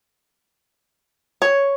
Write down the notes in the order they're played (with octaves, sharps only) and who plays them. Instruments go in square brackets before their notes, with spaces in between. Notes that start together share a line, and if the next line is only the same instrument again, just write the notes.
[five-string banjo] C#5